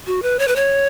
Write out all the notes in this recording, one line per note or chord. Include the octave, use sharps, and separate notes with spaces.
F#4
B4
C#5
B4
C#5